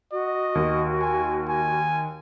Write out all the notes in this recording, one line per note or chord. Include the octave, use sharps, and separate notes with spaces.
F#4 D#5
D#2
G#5
G#5